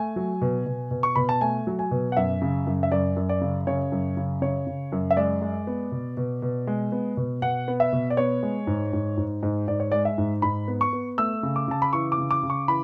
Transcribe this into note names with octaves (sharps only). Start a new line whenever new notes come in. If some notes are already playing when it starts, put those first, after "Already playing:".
Already playing: A3 G#5
F#3
B2
B2
B2
C#6
B2 B5
A5
A3 G#5
F#3
G#5
B2
F#5
F#2 E5
C#3
F#2
E5
F#2 D5
F#2
D5
C#3
C#3 C#5
F#2
C#3
C#3 C#5
C#3
F#2
E5
G#3 D5
G#3
B3
B2
B2
B2
G#3
B3
B2
B2 F#5
B3
E5
B2
D5
B3 C#5
G#3
G#2
G#2
G#2
G#2
G#2 D5
C#5
G#3 D5
E5
G#2
G#2 B5
B3
C#6
B3
A3 E6
C#3
D6
C#3 A5
B5
E3 C#6
D6
C#3
D6
C#3
C#6
E3 B5